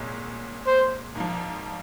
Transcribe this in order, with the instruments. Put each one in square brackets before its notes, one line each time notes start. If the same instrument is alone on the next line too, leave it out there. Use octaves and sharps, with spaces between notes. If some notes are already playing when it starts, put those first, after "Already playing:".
Already playing: [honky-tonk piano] C2 A#2 G#3 C#4
[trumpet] C5
[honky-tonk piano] G#1 G#2 F3